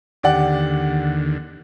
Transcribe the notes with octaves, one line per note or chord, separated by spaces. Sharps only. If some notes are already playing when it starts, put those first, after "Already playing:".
D#2 D3 G4 D5 F#5